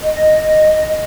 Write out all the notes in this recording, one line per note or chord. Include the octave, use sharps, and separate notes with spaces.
D#5